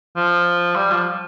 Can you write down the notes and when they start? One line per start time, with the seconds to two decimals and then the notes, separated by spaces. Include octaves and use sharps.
0.16 F3
0.75 G3
0.91 F3